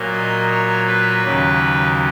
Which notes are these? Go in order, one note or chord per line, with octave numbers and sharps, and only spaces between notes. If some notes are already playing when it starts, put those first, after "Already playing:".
Already playing: A#2 F#3 A#3
D#5
C#5
B4
D#2 C#3 F#3